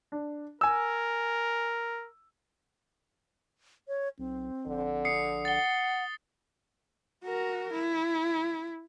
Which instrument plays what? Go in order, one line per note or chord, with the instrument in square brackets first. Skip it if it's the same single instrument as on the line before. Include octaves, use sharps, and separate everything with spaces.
[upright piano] D4
[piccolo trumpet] A#4 [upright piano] G#5 E6
[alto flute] C#5
[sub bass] B1 [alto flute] C4
[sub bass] A#1 [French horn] D3
[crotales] D#6 C7 C#7
[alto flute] F#5 [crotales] A6 G7
[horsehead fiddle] F#4 A#4
E4